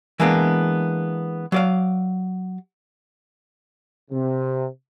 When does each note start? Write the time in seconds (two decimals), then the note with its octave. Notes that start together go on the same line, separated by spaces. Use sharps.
0.20 E3 G#3 A#3 B3 D4
1.52 F#3 D5 F5
4.11 C3